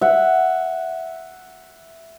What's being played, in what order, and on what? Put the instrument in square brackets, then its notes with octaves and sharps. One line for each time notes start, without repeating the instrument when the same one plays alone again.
[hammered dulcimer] E5 F#5